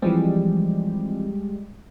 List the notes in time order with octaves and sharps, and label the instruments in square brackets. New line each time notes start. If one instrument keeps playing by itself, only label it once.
[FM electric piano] E3 F3 C4 [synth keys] G3 G#3